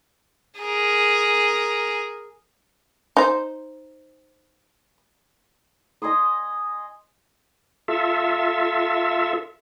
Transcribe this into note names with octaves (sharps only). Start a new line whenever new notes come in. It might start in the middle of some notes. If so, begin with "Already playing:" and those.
G#4 A#4
D#4 C5
D#5 G#5 C6 D#6
F4 A4 E5